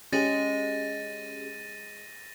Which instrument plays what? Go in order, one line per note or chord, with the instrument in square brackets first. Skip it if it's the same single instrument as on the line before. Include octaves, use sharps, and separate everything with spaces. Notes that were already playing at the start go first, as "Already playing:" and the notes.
[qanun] G#3 [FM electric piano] C#4 G4 G#4 [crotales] A6 A#6 D#7